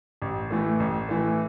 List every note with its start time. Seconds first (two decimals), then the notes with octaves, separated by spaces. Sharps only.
0.22 A1
0.51 A2 E3 A3
0.80 A1
1.09 A2 E3 A3